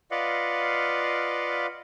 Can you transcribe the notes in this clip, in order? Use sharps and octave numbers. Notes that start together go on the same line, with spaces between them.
F4 B4 D5 D#5 F5 F#5